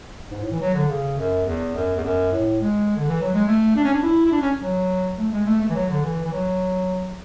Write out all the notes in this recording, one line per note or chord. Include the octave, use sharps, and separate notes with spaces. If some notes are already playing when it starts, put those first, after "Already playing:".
G#2
A2
E3
F#3
D3
C#3
F#2
E2
F#2
E2
F#2
A2
G#3
D3
E3
F#3
G#3
A3
D4
C#4
D4
E4
E4
D4
C#4
F#3
A3
G#3
A3
A3
E3
F#3
D3
E3
E3
F#3